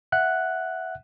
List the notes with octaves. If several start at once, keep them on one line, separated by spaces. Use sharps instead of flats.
E5 F#5 F#6